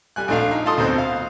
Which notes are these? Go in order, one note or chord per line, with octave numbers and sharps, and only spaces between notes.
G3 G#5 F#6
A#1 A3 D4 F5
D#4
F4 A4 A5 C6 D#6
D2 B2 C4 C5
F5